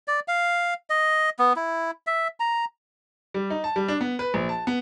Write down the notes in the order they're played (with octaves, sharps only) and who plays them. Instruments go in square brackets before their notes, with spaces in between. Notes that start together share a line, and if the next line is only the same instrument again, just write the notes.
[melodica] D5
F5
D#5
B3
E4
E5
A#5
[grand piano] G3
D#4
A5
G3
D4
B3
B4
A#1
A5
B3